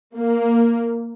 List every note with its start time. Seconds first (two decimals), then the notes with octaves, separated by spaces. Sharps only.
0.16 A#3